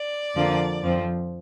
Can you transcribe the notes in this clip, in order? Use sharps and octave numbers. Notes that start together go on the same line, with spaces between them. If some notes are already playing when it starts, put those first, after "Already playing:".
Already playing: D5
F2 D3 F3 A#3
F2 F3 C4